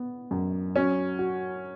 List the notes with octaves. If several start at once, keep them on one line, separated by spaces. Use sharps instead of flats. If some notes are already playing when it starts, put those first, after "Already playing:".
Already playing: B3
F#2
F#3 C#4
F#4